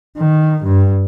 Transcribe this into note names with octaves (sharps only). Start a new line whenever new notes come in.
D#3
G2